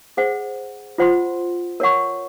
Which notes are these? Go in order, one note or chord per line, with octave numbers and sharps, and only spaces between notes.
G#4 C5 F#5
F4 C5 F#5 C6
A#4 C#5 F#5 C#6